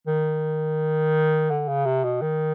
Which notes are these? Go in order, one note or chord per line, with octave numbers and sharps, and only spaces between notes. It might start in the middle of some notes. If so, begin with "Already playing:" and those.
D#3
D3
C#3
C3
B2
D#3